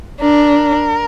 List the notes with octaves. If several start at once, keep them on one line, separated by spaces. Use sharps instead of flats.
D4 A#4